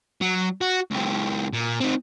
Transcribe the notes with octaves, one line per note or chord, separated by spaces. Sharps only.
F#3
F#4
C#2 G4
A#2
C4 D#4